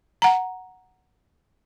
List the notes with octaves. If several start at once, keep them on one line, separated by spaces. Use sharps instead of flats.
F#5 A#5